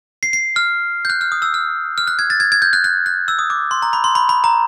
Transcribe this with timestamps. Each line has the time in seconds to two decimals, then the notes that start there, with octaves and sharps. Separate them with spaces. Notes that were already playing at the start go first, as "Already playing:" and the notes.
0.23 C7
0.33 C7
0.56 F6
1.05 G6
1.10 F#6
1.21 F6
1.32 D#6
1.42 E6
1.54 F6
1.98 F6
2.07 F#6
2.19 G#6
2.30 A6
2.40 G#6
2.52 G#6
2.62 G6
2.73 F#6
2.84 F#6
3.06 F#6
3.28 E6
3.39 D#6
3.50 D6
3.71 C6
3.82 A#5
3.93 B5
4.04 C6
4.15 B5
4.29 B5
4.44 A#5